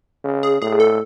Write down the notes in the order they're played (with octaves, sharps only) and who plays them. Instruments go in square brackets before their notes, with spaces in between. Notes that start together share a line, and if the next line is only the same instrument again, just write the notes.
[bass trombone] C#3
[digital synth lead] G#4
[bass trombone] A2 [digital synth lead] G#4
[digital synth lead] A4